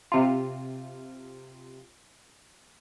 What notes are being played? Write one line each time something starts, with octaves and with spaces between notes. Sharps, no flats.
C3 F4